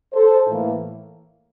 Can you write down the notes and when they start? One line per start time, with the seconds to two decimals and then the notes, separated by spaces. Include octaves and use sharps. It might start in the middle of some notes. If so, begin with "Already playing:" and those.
0.13 A4 C5
0.47 A2 E3 A#3 E4